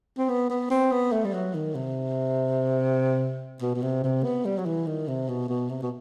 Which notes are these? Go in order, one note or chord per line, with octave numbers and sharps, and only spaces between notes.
C4
B3
B3
C4
B3
A3
G3
F#3
D#3
C3
B2
B2
C3
C3
B3
G3
F#3
E3
D#3
C3
B2
B2
C3
B2